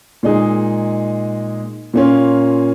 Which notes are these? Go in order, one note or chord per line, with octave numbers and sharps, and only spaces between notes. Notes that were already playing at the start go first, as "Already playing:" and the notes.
A#2 G#3 D#4 G#4
A#2 A#3 C#4 F4